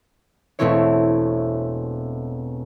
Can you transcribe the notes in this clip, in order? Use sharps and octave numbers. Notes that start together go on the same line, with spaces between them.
E1 B2 A3 C4 E4 C#5